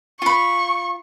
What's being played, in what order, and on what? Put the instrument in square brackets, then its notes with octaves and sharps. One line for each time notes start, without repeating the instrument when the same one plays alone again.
[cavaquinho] F4 B5 [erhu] C#6